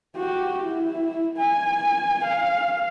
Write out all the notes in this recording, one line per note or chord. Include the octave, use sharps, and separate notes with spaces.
F#4 G4
E4
G#5
F5